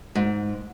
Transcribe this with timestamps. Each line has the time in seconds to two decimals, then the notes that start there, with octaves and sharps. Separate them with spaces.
0.15 G#2